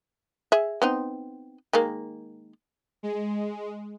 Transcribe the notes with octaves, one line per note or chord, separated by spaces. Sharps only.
G#4 E5
B3 C4 D#4
D#3 G#3 A#3
G#3